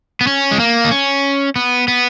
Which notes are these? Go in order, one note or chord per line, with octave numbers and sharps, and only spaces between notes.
B3
C#4
G#3
A#3
D#4
C#4
B3
B3